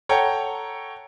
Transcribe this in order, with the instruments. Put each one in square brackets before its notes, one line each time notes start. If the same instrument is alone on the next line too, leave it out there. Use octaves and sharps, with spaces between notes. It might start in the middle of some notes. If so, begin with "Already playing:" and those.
[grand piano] A4 C#5 F#5 G5 A#5